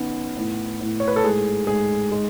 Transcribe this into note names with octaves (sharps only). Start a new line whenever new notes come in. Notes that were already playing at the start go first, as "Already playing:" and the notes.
Already playing: D#3 B3 C#4
A2
A2
C#5
B4
A4
G#2 G#4
G#2 G#4
G#3